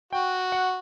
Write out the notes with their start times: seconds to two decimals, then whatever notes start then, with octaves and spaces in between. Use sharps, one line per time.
0.13 F#4 G5
0.52 F#5